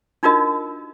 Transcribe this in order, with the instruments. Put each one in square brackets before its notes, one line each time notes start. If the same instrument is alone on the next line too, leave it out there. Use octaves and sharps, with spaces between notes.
[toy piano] D4 D#4 F4 F#4 A#4 D#5